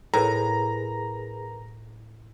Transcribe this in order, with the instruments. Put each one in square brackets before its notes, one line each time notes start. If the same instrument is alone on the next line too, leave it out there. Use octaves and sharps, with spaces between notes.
[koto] A2 [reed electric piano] G#4 A#4 B4 [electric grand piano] A#5